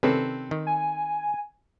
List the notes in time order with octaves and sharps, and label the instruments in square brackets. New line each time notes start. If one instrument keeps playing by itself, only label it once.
[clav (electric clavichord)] C3 D#3 C#4 [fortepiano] C4 A4 B4
[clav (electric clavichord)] D#3
[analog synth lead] G#5